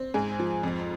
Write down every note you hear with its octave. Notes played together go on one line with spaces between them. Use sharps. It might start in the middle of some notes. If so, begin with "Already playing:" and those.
Already playing: C4
G#2 G#4
F3
F2